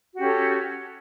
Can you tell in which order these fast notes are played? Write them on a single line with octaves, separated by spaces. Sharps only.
F#4 G4 C#4 A4